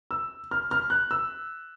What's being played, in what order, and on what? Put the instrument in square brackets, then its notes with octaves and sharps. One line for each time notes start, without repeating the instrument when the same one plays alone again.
[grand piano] E6
F6
F6
F#6
E6